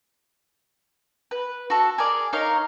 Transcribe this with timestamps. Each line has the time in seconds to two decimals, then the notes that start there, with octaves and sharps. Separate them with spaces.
1.31 B4
1.70 F#4 A4
1.98 G#4 A#4 D5
2.33 D#4 A#4 C#5 F5